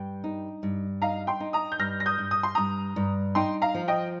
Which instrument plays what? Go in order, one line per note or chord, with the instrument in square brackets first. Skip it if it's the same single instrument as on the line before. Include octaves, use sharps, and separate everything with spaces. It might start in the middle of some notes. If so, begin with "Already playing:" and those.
Already playing: [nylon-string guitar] G2 [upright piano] G5
[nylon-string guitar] D#4
G2
[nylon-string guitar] D#4 [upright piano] F5 A#5
[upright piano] G5 C6
[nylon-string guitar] D#4
[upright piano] A#5 D#6
G6
[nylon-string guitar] G2 [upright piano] F6 A#6
[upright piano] A#6
D#6 G6
[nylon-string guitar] G2
[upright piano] D#6
C6
[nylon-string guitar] G2 [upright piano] A#5 D#6
[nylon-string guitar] G2
[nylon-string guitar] D#4 [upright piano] G5 C6
[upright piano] F5 A#5
[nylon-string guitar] F3
[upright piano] D#5 G5